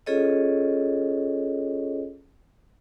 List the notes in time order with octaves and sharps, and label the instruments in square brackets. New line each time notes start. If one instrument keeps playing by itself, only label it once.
[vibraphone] C#4 F4 G#4 A4 C#5 D#5